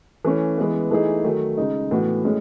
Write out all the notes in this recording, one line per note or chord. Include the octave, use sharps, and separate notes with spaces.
E3 A3 C#4
E3 G#3 B3
E3 A3 D#4 G#4
D#3 F#3 A3
C#3 G#3 D#4
A2 E3 B3 F#4
A2 G#3 C#4